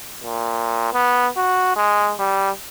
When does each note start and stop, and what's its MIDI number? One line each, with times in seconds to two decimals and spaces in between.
0.23 0.89 46
0.94 1.28 59
1.37 1.72 66
1.76 2.14 56
2.19 2.50 55